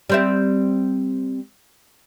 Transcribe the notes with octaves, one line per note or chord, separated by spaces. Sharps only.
G3 C4 E5